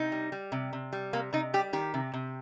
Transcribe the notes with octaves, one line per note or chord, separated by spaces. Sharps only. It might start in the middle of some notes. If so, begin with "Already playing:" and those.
Already playing: C3 D#4
G3
G3
C3
C3
G3
C3 A#3
C3 D#4
G3 G4
D#3 G4
C3
C3